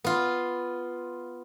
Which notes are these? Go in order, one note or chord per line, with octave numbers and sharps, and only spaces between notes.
B3 F4